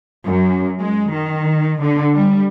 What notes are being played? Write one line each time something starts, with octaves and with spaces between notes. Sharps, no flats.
F#2
G#3
D#3
D3
G3